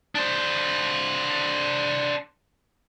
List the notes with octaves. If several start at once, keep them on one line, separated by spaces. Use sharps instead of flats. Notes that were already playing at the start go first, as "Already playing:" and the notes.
D4 C5